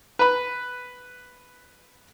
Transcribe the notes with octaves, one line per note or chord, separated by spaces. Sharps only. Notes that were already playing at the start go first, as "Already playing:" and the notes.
B4 B5